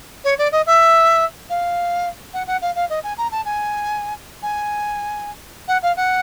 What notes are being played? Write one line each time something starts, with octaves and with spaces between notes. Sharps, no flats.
C#5
D5
D#5
E5
F5
F#5
F#5
F5
F5
D#5
G#5
A#5
A5
G#5
G#5
F#5
F5
F#5